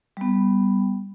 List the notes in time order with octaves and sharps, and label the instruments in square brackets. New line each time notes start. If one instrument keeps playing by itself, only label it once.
[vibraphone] G3 B3